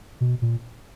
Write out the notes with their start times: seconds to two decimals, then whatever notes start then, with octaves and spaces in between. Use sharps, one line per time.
0.21 B2
0.42 A#2